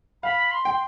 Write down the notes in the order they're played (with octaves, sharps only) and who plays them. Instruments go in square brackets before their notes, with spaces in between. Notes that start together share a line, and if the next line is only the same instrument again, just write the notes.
[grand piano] F5 [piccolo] B5
[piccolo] C6
[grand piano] G5